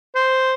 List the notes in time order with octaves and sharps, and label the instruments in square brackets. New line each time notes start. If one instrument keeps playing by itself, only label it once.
[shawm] C5